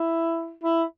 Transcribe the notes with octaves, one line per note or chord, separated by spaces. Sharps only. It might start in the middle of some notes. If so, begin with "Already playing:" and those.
Already playing: E4
E4